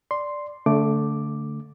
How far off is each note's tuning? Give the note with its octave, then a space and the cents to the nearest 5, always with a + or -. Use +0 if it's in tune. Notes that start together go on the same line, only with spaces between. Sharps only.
D5 +0 C6 +0
D3 -30 A3 +0 D6 +0